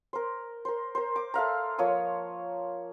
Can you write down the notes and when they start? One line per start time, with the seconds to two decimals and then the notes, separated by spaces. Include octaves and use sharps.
0.13 A#4 C5
0.65 A#4 C5
0.95 A#4 C5
1.16 D6
1.34 A4 E5 F5 A#5
1.78 F3 A#3 C#5 D#6